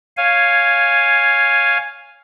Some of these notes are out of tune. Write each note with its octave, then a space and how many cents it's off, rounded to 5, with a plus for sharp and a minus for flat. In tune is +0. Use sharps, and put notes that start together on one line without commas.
C#5 +0 F5 +0 G#5 -5